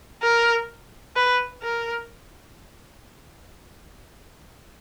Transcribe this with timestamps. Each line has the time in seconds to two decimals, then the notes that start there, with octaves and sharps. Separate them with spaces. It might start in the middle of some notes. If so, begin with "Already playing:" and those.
0.23 A#4
1.16 B4
1.63 A#4